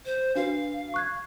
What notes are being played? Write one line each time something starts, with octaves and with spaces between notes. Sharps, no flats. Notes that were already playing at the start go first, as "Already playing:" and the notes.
C5
D4 F#4 B4 F5
C#6 F#6 G#6